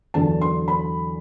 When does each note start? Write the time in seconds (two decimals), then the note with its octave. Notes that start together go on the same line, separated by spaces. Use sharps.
0.14 E2 D3 F#3 A5
0.41 C6
0.68 B5